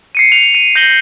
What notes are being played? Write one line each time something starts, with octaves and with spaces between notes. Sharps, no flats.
C7 C#7 D#7
F7
D#7
G6 A#6 F#7 G7